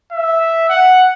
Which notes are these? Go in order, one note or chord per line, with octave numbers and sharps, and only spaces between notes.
E5
F#5